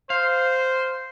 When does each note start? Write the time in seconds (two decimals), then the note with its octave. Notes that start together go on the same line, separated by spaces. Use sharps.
0.10 C5 F5